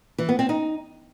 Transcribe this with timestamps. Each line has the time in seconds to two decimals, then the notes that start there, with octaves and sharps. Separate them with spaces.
0.18 E3
0.29 B3
0.39 C4
0.49 D#4